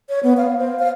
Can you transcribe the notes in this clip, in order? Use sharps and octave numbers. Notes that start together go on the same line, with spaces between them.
C#5
B3
F5
C5
F5